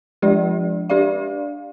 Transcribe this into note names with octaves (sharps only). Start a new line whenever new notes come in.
F3 G#3 D4 G4 D5
D4 G4 D5 F5